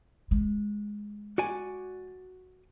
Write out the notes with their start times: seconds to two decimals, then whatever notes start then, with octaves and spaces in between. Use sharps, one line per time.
0.31 G#3
1.38 F#4 D5 G#5